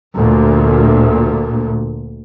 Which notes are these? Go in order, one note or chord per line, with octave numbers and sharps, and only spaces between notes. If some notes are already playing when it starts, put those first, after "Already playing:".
D2 A#2